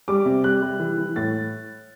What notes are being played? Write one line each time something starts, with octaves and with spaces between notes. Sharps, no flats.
G3 D6
C3
G3 F#6
G3
E3
E3
A2 A6